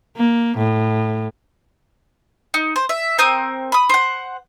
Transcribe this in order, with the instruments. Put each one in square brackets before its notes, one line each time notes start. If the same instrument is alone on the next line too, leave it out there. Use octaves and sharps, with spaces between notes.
[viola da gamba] A#3
A2
[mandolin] D#4
C5
E5
C4 A#4 D#6 G6
B5 D#6
C5 F#5